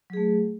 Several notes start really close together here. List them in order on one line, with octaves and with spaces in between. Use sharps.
F#3 G#4 A3